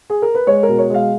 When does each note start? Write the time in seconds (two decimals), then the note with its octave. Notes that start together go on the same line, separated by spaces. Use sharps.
0.10 G#4
0.22 A#4
0.35 B4
0.47 G#3 C#5
0.63 A#4
0.68 B2
0.78 C#5
0.90 G#3 F5